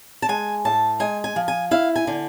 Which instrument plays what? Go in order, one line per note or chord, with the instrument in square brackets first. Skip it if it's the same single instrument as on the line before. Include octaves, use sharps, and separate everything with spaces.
[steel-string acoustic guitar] A5
G#3 G#5
A2 A5
G#3 G#5
G#5
F3
G#5
E4 F5
G#5
D3